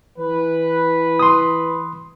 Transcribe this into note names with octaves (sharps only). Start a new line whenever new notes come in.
E3 B4
C6 D#6